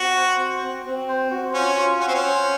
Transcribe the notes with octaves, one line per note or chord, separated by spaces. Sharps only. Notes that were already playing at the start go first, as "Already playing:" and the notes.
Already playing: C4 F#4
C5
F#4
C4
C4
C5
F#4
C#4 F4
F4
C#4 F#5
C4
C#4
C5